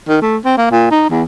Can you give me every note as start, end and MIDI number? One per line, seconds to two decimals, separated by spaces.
0.08 0.20 51
0.22 0.37 57
0.45 0.55 60
0.58 0.67 58
0.71 0.89 46
0.91 1.07 63
1.10 1.23 40